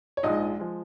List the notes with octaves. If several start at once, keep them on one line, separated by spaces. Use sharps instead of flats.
C#5
A#1 G#2 F3 G#3 D#4 D#5
F3 G#3